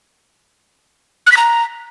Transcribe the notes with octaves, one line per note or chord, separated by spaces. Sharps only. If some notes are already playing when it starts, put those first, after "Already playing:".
F#6
B6
A#5